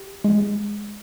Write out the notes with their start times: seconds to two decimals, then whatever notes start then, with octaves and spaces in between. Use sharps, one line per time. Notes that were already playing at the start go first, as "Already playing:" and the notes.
Already playing: G4
0.24 G#3